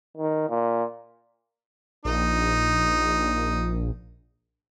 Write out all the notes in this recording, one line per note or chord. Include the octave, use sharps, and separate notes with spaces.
D#3
A#2
A#1 D#4